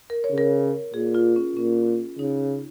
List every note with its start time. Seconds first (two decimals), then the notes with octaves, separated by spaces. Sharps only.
0.10 A#4
0.24 C#5
0.32 C#3
0.38 A#4
0.94 A#2 G#4
1.15 F4
1.36 C#4
1.56 A#2 C#4
2.19 C#3 D#4